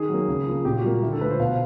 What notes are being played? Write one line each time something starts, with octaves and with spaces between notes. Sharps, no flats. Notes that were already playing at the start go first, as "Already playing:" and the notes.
Already playing: D#3 G#4
F#3 A#3
C#3
F3 A#3
A#2 G4
F#4
G3 A#3
D3 E4
A4
F3 A3 B4
C5
B2 F5